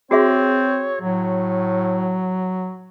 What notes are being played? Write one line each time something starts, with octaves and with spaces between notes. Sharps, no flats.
C4 F#4 G#4 C#5 E5
A2 F#3